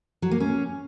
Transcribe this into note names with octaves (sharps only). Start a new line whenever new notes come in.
F#3
A#3
C#4